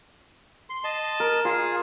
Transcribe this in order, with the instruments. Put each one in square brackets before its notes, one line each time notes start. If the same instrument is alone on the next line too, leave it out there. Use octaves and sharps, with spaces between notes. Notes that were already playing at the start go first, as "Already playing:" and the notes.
[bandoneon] C6
D#5 A5
[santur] A#4
[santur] F4 [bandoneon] G#4